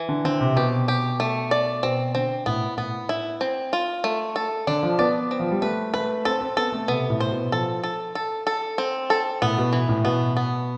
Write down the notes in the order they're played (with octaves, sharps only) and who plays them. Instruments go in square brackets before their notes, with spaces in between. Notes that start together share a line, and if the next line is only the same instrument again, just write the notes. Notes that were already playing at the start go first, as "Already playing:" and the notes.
Already playing: [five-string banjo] E3
[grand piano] D3
[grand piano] D3 [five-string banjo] C4
[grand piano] C3
[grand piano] B2 [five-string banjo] G4
[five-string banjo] G4
A3
D5
[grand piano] B2 [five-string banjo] C4
[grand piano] D3 [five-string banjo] C4
[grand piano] A2 [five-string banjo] B3
[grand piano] A2 [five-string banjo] B3
[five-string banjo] E4
C4
F4
A3
A4
[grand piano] D3 [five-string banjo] D4
[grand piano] F3
[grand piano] B3 [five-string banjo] D5
[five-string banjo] C4
[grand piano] F3
G3
[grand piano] A3 [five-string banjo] B4
[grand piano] A3 [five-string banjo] B4
[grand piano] C4 [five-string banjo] A4
[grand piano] C4
[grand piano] B3 [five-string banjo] A4
[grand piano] A3
[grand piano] C3 [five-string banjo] B3
[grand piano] A2
[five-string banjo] C5
[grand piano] B2
[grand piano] F3 [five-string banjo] A4
[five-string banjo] A4
A4
A4
C4
A4
[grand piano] A2 [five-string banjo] B3
[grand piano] B2
[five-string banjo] E3
[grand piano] A2
[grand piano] B2 [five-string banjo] B3
[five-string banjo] B3